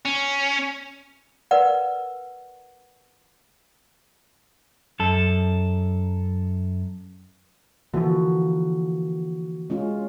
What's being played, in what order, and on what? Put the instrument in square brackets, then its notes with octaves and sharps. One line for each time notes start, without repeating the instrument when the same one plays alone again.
[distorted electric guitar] C#4
[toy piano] A#4 B4 D5 F#5
[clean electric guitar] F#2 A4
[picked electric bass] D3 E3 F3 [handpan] A#3 F#4
[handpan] G#3 C#4 F4